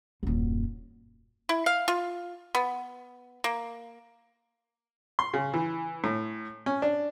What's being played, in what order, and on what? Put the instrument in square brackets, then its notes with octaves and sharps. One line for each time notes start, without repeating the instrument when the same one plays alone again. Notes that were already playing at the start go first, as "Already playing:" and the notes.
[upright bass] D#1 F#2
[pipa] E4
F5
F4
B3
A#3
[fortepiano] C6
C#3
E3
A2
C#4
D4